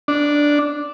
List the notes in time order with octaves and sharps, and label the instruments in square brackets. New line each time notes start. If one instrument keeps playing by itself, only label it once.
[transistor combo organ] D4